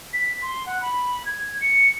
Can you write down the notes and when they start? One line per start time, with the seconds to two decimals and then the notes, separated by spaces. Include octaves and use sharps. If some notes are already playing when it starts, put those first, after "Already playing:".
0.13 B6
0.42 C6
0.66 F#5
0.81 B5
1.25 G#6
1.61 C#7